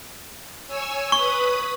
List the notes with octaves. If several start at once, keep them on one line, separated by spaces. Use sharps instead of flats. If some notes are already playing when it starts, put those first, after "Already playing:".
C#5 G#5 E6
B4 B5 C#6 D#6